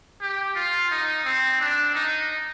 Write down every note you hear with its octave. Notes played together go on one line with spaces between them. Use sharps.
G4
F4
D#4
C4
D4
D#4